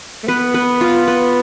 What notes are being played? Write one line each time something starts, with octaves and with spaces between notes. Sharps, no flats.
A3
B3 B4
B4
F4
B4